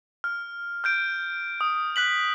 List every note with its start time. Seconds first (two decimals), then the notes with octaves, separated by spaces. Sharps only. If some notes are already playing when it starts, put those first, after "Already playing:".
0.24 F6
0.84 F6 G6 D7
1.61 D#6
1.96 F#6 B6 F#7